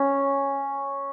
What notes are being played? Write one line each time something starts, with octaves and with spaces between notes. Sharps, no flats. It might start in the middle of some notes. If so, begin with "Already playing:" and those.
Already playing: C#4